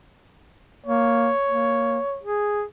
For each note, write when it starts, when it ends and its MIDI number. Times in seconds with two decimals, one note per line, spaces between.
0.86 1.31 58
0.86 2.20 73
1.49 1.98 58
2.23 2.63 68